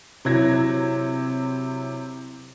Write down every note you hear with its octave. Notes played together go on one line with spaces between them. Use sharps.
C3 F#3 E4 G#6 A#6